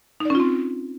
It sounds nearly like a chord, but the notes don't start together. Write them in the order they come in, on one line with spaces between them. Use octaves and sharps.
D#4 D5 C#4 F4 C4